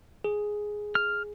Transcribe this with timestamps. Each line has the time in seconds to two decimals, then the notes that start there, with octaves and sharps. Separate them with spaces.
0.24 G#4
0.95 F6